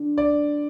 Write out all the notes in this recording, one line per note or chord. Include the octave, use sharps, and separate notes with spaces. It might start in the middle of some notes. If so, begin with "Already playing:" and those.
Already playing: D3
D5